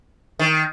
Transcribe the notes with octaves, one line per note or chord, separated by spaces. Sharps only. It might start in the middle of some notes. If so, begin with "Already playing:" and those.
D#3